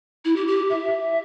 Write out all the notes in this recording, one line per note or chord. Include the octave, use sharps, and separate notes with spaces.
E4
G4
G4
E5